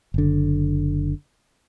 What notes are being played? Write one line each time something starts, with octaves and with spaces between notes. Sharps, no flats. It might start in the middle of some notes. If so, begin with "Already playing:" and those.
F#1 D3